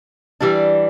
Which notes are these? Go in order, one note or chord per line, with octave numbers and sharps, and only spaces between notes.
E3 G3 D4